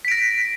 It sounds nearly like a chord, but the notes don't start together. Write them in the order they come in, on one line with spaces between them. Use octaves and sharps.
B6 D7 A#6